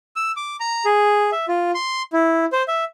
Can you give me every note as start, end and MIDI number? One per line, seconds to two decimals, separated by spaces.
0.16 0.32 88
0.36 0.56 86
0.60 0.85 82
0.85 1.30 68
1.32 1.46 76
1.48 1.71 65
1.75 2.02 84
2.13 2.45 64
2.52 2.63 72
2.68 2.84 76